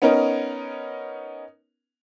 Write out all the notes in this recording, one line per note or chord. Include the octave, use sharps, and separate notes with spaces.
B3 C#4 D#4 A#4